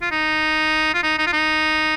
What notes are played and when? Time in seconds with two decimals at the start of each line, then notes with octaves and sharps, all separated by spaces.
0.02 F4
0.12 D#4
0.94 F4
1.03 D#4
1.19 D#4
1.27 F4
1.33 D#4